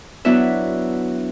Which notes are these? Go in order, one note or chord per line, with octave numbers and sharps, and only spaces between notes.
F#3 B3 D4 E4 E5